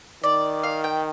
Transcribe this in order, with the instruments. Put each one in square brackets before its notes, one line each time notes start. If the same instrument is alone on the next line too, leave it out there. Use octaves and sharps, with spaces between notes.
[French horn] D#3 [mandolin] D5
[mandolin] F5
G5